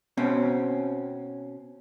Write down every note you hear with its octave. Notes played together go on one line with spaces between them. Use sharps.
B2 C4 C#4